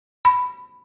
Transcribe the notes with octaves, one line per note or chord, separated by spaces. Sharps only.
B5